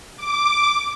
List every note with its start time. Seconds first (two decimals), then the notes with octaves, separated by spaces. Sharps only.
0.17 D6